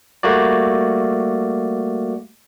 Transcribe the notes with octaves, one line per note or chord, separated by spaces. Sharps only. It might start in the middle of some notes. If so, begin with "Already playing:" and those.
G3 A3 A#3 F#4 D5